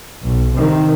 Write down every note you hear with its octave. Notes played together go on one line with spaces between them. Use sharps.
B1
C3 D#3